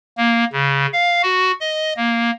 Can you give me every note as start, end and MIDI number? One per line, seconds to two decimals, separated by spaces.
0.17 0.44 58
0.52 0.86 49
0.93 1.22 77
1.23 1.52 66
1.60 1.93 75
1.97 2.31 58